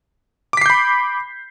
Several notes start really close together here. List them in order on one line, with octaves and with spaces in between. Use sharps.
D6 B6 C7 G6 B5